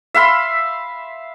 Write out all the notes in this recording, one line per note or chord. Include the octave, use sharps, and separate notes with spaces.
E5 F5 B5 C6